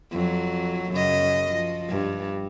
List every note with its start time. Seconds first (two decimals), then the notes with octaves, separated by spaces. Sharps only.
0.12 F2 F#3
0.92 F#2 C#3 D#5
1.51 F3
1.89 G2